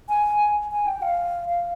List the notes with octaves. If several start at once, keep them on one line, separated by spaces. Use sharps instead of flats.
G#5
G#5
G5
F5
F5